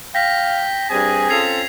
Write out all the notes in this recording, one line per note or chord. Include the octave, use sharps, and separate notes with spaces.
F5 G5 A#6 B6
G2 G3 C4 G#4 G#5
C#4 F4 A4 G#6 C7 F7